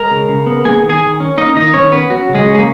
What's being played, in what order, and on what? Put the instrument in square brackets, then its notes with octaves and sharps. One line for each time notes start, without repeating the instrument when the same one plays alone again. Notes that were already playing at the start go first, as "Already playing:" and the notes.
Already playing: [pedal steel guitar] G#3 A#4 A#5
C#3
C#3
B3
A#3 G#4 G#5
D#3
G#4 G#5
D#3
C#4
A#3 D#4 D#5
D#3 D#4 D#5
D#3 C#4 C#5
B3 C#4 B4
F#3 F#4
C#3
G#3 G#4
C#4
G#4
A#3